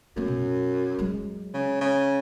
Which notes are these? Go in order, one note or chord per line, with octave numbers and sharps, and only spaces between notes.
F#2 A3 B3
B2
F#3 G#3
C#3
C#3